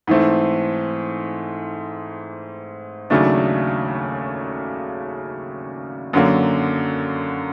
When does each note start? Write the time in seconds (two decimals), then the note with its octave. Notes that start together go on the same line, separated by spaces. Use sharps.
0.07 G#2 E3 A3 C4
3.10 D#2 C#3 F#3 A3 D4
6.13 F#2 D3 F#3 A#3